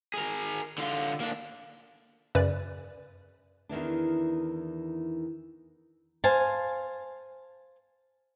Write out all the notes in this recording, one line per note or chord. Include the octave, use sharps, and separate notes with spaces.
G#4 A#4
D3 F4
A#3 D4
F#2 C#3 B4 D5
E2 D#3 E3 D4
C5 F5 G#5 A5